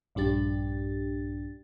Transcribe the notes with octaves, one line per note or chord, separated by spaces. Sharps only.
A#1 G2 D4 G4 A6